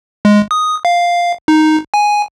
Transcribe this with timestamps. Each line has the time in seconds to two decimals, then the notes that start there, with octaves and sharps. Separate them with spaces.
0.25 G#3
0.51 D#6
0.85 F5
1.48 D#4
1.94 G#5